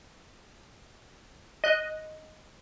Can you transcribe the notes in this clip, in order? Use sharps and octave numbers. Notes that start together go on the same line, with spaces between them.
D#5 F#6